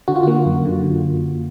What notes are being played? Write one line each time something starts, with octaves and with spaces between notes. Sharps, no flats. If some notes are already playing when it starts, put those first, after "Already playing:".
D3 F#4
F4
A#3 F#4
F#2
D3